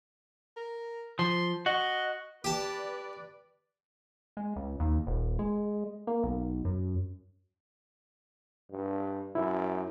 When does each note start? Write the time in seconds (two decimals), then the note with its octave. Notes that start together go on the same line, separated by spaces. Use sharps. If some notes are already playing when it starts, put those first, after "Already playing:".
0.57 A#4
1.19 F3 C6
1.66 F#4 D#5
2.44 G4 B4 D5 A5
4.37 G#3
4.56 C#2
4.80 D#2
5.07 D#1
5.39 G#3
6.07 A#3
6.23 B1
6.65 F#2
8.71 G2
9.35 F#2 E4